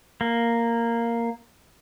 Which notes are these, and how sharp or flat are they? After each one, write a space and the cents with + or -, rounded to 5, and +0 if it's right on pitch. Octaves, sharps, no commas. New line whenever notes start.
A#3 -5